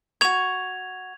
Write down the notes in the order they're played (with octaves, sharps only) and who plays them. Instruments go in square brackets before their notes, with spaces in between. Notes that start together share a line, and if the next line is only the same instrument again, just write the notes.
[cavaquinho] F#4 C#6 [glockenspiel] G#6 F7